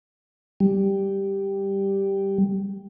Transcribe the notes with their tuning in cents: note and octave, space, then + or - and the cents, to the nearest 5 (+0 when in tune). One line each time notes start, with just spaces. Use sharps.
G3 +0